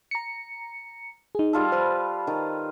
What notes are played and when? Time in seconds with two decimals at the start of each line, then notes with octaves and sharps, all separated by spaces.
0.11 A#5 C#7
1.35 D#4 G#4
1.53 G3 F4 A4
1.72 B4 C5
2.27 D#3